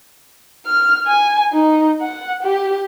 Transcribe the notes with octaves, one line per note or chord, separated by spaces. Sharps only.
F6
G#5
D#4
F#5
G4